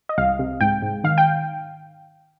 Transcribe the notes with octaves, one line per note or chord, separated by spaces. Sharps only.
D#5
C2 F5
C3
G#2 G5
G#2
D#3 F5
G5